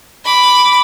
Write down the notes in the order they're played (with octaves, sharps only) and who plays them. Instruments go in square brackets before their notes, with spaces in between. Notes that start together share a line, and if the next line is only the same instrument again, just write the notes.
[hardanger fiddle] B5 D6